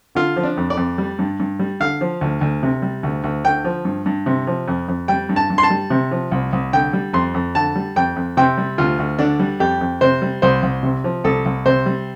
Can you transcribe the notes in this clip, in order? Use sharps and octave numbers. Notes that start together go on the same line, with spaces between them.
D3 F4
F3
D4
F2
D5
F2
G3
G2
G2
G3
D3 F5
F3
D2
D2
C3
G3
D2
D2
D3 G5
F3
G2
G2
C3
F3
F2
F2
G3 G5
G2
A5
G2
C6
A5
G3
C3
F3
C2
C2
D3 G5
G3
F2 C6
F2
D3 A5
G3
F2 G5
F2
C3 G5
G3
D2 F4
D2
D3 D4
G3
F2 G4
F2
C3 C5
G3
C2 C5
C2
C3
F3
C2 A4
C2
C3 C5
G3